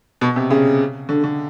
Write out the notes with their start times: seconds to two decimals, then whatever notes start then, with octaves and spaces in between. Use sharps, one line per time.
0.21 B2
0.36 C3
0.51 C#3
1.09 D3
1.24 D3